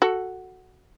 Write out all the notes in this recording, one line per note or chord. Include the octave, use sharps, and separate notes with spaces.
F#4 A4